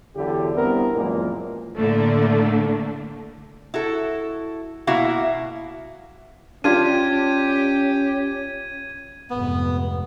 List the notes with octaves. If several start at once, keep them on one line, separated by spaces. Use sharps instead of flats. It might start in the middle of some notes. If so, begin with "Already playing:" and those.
E2 D3 F#3 E4 G4
G2 B3 C4 E4 A#4
F#2 A#2 E3 F3 G#3 A#3
A2 D3 A3 A#3 D4
E4 F#4 A4
B2 A#3 E4 F#4 E5 F5
C#4 D4 F4 G4 G#6 D#7
F1 G#2 B3